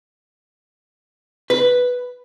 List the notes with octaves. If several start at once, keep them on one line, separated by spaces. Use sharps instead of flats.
B4